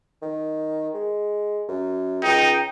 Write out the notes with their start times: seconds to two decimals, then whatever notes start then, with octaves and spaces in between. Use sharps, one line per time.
0.22 D#3
0.94 G#3
1.69 F#2
2.23 C#2 D#4 G5